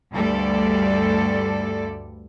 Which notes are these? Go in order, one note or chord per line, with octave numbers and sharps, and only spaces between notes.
D2 G2 G3 A4 D5